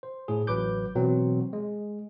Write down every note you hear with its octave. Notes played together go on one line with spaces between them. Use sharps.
C5
A2 G#4
A1 F#3 B4 D6 G6
B2 E3 F#3 C4
G#3